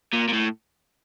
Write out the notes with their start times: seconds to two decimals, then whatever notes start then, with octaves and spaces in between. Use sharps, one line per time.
0.13 A#2
0.28 A#2
0.33 A2